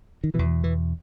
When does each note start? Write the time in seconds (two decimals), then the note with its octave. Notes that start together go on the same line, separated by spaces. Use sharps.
0.24 D#3
0.34 B2 E3
0.39 E2
0.64 E3